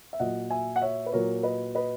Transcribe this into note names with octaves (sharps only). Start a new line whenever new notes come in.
E5
A#2 F#3 D#5 F#5
E5 G#5
F#5
C#5 E5
B4
A#2 F#3 A#4 C#5
B4 D#5
B4 D#5